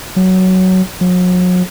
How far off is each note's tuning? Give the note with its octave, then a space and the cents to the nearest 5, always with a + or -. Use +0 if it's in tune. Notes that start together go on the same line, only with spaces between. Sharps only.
F#3 +10
F#3 -40